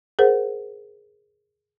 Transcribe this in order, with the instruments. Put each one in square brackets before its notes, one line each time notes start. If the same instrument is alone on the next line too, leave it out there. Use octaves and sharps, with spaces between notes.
[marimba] G#4 A#4 C5 F#5